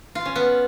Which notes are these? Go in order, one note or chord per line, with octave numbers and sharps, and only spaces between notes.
F4
C#4
B3